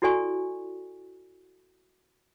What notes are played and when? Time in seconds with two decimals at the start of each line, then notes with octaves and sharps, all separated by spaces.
0.02 E4 F#4 A4 D5 G#5 C#6